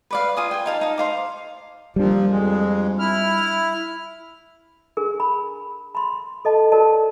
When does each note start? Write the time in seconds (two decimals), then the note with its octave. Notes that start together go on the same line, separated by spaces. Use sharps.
0.11 B4 D5 F5
0.37 F4 G#5 D#6
0.51 G5 G#5
0.66 D#4 F5 A5
0.81 D#4 A5
0.98 C5 F5 D6
1.96 A#2 F3 G3 D4
2.30 F2 G#3
2.99 E4 F6
4.97 D4 G#4 A#4
5.20 B5
5.95 B5 C6
6.45 A4 D#5 A5
6.72 F#4 A4 A#4 D5 A5